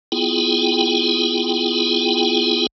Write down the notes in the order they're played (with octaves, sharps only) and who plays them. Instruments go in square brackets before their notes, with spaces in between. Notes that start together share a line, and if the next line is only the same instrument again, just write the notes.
[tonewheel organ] B3 E4 F4 G#4 G5